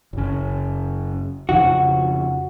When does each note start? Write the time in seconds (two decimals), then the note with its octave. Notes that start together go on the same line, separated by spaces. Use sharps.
0.13 F#1 C#3
1.49 F2 C#3 F3 F#4